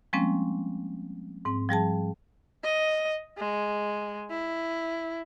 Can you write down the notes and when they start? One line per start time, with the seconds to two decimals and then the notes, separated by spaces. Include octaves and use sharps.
0.13 F3 G3 G#3 A#3 C4 C#4
1.45 G#2 C4
1.69 F3 G3 G#4 A5
2.64 D#5
3.38 G#3
4.30 E4